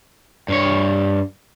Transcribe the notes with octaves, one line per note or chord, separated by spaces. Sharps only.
G2 C#5